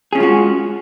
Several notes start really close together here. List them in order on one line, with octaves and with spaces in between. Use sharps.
G#4 C#4 F4 G#3 F#4